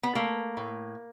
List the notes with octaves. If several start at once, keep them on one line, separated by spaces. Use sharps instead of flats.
B3
A3 A#3
A2